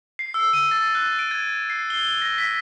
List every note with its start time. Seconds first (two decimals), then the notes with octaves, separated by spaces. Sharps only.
0.19 C7
0.34 E6
0.53 D#7
0.71 A6
0.95 F#6
1.19 D7
1.31 G#6
1.70 C7
1.90 G7
2.22 A#6
2.38 B6